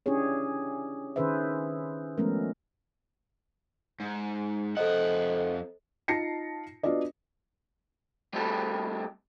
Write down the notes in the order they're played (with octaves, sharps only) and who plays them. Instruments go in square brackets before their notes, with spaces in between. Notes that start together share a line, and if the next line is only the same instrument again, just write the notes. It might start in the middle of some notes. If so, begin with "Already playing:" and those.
[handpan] C#4 D4 E4 G4 G#4 C#5
D#3 C#4 G#4 B4 C5 E5
F3 G#3 A3 B3 C#4 A#4
[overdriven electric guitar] G#2
[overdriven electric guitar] F2 F#5 [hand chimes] A4 C5 D#5
[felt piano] D#4 F4 A5 A#6 C7 C#7
B3 D4 F4 F#4 D5 D#5
[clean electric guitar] G3 A3 C4 E4 G4 A4